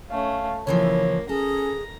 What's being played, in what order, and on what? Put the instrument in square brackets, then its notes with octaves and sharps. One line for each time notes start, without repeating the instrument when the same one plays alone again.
[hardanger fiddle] A3 C#4 [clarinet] F5
[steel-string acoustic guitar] C#3 E3 F3 [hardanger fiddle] A#3 [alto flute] E4 [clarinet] C#5
[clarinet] C#4 [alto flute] G#4 [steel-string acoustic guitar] A4 [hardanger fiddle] A#5